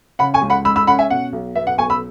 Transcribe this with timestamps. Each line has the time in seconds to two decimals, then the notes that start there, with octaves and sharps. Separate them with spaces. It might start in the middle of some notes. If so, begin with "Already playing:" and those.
0.19 C#3 F#5 B5
0.34 G#5 C#6
0.42 C#2
0.50 F#5 B5
0.65 G#3 B5 E6
0.76 B5 E6
0.87 C#4 F#5 B5
0.99 E5 G#5
1.10 B2 F#5
1.33 B1
1.56 B3 E5
1.67 F#5
1.78 B1 G#5 C#6
1.90 B5 E6